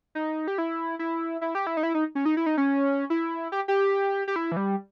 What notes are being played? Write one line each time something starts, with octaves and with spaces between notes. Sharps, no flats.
D#4
G4
E4
E4
E4
G4
E4
D#4
E4
D#4
C#4
D#4
E4
D#4
C#4
E4
G4
G4
G4
E4
E3
G3